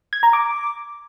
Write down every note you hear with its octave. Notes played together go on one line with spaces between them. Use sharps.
G#6
A#5
D6